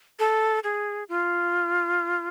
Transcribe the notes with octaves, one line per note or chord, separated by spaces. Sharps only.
A4
G#4
F4